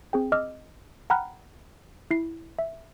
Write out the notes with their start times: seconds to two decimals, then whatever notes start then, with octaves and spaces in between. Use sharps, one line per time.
0.13 C4 G#4 G5
0.32 D#5 D6 E6 F6
1.10 F#5 G5 A#5 B5 F6 F#6
2.11 E4 C7
2.59 E5